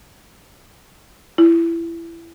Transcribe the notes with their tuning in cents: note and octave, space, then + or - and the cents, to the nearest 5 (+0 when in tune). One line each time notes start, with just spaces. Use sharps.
E4 +20